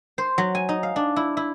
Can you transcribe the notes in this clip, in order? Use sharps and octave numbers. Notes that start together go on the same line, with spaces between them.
C5
F#3
G#5
D#4
F5
D4
E4
E4